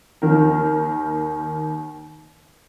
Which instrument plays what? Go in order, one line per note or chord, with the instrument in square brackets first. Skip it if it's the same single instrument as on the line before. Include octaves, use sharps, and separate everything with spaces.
[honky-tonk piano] D#2 D#3 A#4